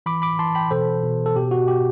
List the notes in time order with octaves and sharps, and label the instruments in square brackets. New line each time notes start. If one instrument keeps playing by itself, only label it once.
[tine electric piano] E3 B5 D6
B5 D6
E3 A5 C6
G5 B5
B2 A4 C5
B2
A4
B2 G4
F#4
B2 G4